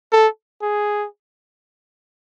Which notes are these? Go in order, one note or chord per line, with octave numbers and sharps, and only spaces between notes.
A4
G#4